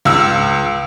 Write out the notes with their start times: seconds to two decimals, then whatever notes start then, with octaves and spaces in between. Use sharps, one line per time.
0.05 C#2 E6